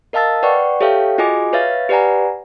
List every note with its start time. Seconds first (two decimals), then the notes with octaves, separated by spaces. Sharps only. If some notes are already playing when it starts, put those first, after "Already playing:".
0.13 A#4 D#5 F5 A5 E6 A6
0.43 B4 D5 F#5 G5 C#6
0.81 G4 A4 C#5 E5 F5 G5
1.18 F4 F#4 G#4 D#5 G#5 D6
1.53 B4 C#5 E5 F5 A6
1.89 G4 B4 D5 F#5 G#5 A#5